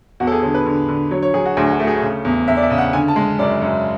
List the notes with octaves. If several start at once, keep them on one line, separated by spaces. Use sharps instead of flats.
E2 F#4
A4
G#4
D3 A4
B4
D3
D3
F#3 C#5
C#5
F#3 G#4
F#4
D2 G#4
F#4
A3
G#4
C#3
E2
E2 E5
D5
E5
C#3
F#5
D3 G#5
A5
G#3
F#2 D5
F#2